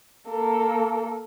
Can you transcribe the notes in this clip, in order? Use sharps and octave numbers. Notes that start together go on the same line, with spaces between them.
A#3 A4